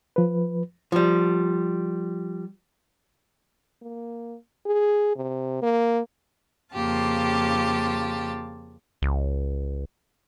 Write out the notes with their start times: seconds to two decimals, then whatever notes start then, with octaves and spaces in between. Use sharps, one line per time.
0.16 F3 B4
0.92 F3 G3
3.82 A#3
4.66 G#4
5.16 C3
5.62 A#3
6.74 F2 C#3 A#3 F4 G4 A5
9.02 C#2